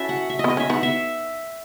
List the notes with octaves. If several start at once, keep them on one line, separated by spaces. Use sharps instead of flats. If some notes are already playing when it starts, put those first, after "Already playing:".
Already playing: C#4 E4 F#4 A4 E5
F#5
E5
D#5
B3
D#5
C#4 E5
B3 D#4 F#5
E5